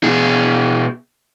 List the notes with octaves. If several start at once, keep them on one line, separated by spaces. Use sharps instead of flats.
B2 G#4